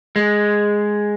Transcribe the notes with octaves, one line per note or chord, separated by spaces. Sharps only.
G#3